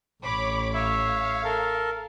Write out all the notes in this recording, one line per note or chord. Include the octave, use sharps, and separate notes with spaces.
A1 C#5 B5 D6
C#5 E5 F5
A4 A#4